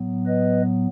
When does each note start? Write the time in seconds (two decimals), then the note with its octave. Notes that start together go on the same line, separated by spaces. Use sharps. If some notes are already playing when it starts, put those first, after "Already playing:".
Already playing: A2 F#3 B3
0.27 B4 D#5